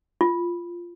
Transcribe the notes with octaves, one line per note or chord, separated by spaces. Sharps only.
F4